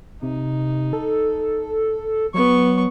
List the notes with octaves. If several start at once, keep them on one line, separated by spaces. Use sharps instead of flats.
C3 D#4
A4
F#3 B3 C#6